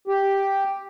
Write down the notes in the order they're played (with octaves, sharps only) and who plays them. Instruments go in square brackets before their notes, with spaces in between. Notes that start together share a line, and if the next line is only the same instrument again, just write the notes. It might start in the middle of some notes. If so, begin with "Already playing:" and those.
[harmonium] G4